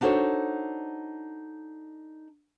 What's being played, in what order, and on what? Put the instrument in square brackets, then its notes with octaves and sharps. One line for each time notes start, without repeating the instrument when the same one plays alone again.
[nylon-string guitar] D4 D#4 F#4 A4 C5 C#5